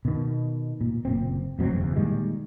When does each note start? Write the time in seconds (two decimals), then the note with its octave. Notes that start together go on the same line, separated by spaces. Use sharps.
0.05 B2 D#3
0.81 A#2
1.05 F#1 A#2 C4
1.59 F1 B2 F#3 C4
1.73 F#1 E2
1.96 A#2 D#3 G3 G#3